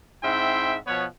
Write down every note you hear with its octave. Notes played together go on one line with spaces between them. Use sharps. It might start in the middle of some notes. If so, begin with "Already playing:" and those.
G#2 C4 E4 E5 G5 C6
B2 F3 B3 B4 C#5